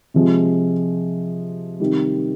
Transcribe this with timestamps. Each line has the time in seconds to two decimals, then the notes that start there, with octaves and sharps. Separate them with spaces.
0.14 C3 F3 G#3
1.80 C3 D#3 G3